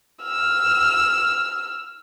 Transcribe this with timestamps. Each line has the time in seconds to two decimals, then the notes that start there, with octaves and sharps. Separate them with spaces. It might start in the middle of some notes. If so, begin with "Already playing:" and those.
0.23 E6 F6